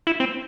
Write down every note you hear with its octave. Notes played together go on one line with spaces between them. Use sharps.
E4
C4